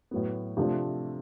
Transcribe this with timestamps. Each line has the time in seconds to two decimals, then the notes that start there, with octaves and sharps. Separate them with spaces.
0.11 A2 F#3 B3
0.57 C3 F3 A3 D4 F4